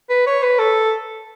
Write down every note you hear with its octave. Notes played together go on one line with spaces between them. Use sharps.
B4
C#5
B4
A4